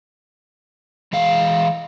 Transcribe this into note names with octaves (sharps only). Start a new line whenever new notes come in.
E3 G#3 F5